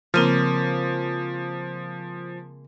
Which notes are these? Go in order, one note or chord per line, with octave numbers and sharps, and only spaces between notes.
C#3 F3 G#3 A#3 C4 F4